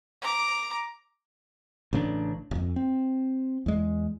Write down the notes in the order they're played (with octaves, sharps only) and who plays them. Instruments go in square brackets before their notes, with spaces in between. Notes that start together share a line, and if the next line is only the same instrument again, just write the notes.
[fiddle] A#5 D6
[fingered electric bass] A1 C#3 G3 D4
D1 F2
C4
E2 G#3